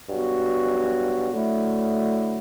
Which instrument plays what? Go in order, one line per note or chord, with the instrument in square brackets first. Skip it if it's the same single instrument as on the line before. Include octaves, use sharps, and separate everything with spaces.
[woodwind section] G2 F#3 B3 F#4
D3 F#3 A3 E4